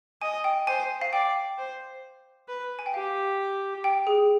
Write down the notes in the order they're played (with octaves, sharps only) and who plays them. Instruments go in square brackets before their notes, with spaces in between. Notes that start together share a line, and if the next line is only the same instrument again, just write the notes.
[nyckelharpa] D#5 [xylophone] G#5
[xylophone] G5
[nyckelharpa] C5 [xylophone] G#5
[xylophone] F5
[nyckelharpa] D5 [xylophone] G5
[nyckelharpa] C5
B4
[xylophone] G#5
G5
[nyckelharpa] G4 [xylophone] F5
[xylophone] G5
G#4